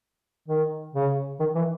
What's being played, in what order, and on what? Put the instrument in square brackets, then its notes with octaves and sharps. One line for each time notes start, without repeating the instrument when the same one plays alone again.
[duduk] D#3
C#3
D#3
E3